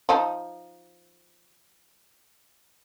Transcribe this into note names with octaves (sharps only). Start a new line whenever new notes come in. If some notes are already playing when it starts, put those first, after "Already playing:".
F3 D#4